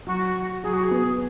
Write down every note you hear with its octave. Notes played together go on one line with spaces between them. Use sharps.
F#3 F#4
F#3 G#4
F#4
G#4
B3